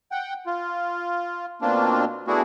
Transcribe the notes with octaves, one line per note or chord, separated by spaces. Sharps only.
F#5 G5
F4
B2 A#3 C4 D4 F4
A3 B3 D4 E4 F#4 G#4